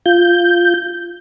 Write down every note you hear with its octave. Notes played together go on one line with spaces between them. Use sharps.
F4 G6